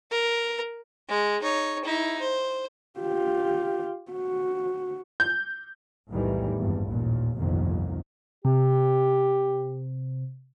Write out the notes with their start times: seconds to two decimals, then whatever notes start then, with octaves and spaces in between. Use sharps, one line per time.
0.11 A#4
1.09 G#3
1.42 D#4 C#5
1.85 D#4 E4
2.21 C5
3.00 F4 G4
4.12 F#4
5.20 G6
6.09 B1 E2 A2 D#3 E3 G3
6.57 G#1 E2 G2
6.87 A1 D#2 A#2
7.38 G1 C2 F2 A#2 D#3
8.45 C3 G4